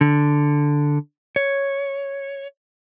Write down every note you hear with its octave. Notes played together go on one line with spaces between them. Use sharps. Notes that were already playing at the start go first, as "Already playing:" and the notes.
D3
C#5